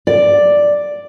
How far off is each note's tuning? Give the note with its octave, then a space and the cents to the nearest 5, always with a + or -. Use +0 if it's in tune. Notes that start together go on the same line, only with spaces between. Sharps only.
D5 +0